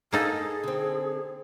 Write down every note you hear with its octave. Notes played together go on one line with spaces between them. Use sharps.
A#3 D#4 G#4 A4
D3 C4